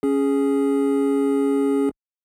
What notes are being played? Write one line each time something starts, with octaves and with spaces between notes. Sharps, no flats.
C#4 G#4